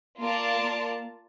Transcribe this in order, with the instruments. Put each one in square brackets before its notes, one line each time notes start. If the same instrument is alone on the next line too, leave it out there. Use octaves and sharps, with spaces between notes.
[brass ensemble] A#3 [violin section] F4 A#4 D5 A5
[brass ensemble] A#3